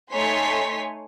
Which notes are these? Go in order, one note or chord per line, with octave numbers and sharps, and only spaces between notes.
A3 D#4 C#5 G#5 C6 B6